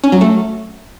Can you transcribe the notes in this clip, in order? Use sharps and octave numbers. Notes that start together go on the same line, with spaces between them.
C#4
F#3
A3